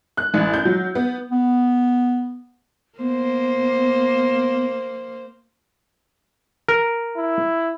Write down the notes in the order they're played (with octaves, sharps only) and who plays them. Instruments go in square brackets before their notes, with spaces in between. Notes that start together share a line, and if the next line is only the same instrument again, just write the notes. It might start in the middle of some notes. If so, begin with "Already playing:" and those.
[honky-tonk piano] F#6
A1
G6
F#3
B3
[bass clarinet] B3
[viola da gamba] A#3 C5 [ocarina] B3
[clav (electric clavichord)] A#4
[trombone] E4